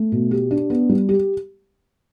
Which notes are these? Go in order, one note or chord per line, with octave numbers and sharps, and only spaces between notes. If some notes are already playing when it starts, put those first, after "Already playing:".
Already playing: A3
B2
G4
D4
B3
G3
G4